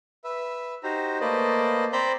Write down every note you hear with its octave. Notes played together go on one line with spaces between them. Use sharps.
B4 E5
D#4 F#4 G4 C5 A#5
A3 A#3 B4 C5 D5 D#5
C4 C5 D5 A#5 B5 G6